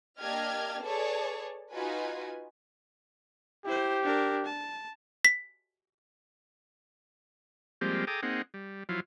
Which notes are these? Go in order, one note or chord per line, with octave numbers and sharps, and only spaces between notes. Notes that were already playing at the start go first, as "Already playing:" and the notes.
A#3 D4 G4 D#5 F6 G#6
G#4 A4 B4 C#5 D5 A5
D#4 F4 F#4 B4 G#5
E4 G4 C5
D4 A#4
A5
B6
F3 G3 G#3 A#3 C4 G4
G#4 A4 G5 A#5 D6 D#6
A#3 C4 D#4 G#4 F#5
G3
F3 F#3 E4 F4